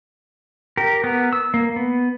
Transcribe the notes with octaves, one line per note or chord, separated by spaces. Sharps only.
G4 A#4
B3 A#4
E6
A#3
B3